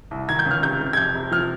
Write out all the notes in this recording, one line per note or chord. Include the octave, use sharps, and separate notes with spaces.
C2
D#3 G#6
G6
C#2 F6
C3 G6
C3
G#6
F2 G6
C3
F3 F6